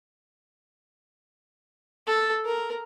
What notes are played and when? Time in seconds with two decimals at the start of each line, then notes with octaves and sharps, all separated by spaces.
2.07 A4
2.46 A#4